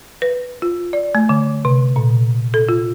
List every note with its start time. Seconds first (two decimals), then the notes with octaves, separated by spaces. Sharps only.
0.22 B4
0.62 F4
0.93 D5
1.15 A3
1.29 D3
1.65 C3
1.96 A#2
2.54 A4
2.69 F4